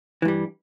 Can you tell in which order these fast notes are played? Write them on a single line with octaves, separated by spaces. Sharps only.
E3 G2 G3